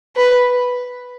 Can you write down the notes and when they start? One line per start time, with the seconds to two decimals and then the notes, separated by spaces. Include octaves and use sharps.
0.16 B4